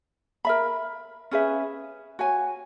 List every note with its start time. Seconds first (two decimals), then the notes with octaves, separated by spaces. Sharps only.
0.45 A#4 E5 B5
1.31 C#4 G#4 B4 E5
2.19 F#4 C#5 G#5